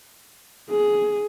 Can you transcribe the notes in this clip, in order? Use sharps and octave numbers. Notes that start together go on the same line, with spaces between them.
G#4